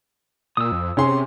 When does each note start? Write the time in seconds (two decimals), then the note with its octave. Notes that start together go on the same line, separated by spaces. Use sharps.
0.57 A#2 D#6 E6
0.72 F2
0.97 C3 C#4 G#4 C6